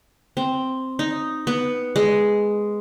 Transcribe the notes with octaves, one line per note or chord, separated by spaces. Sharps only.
C4
D#4
B3
G#3